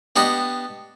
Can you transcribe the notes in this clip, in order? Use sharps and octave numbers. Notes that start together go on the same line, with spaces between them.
B3 D4 G4 D#5